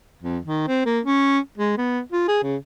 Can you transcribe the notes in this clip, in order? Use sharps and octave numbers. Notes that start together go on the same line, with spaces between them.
F2
D#3
C4
A#3
C#4
G#3
B3
F4
G#4
C#3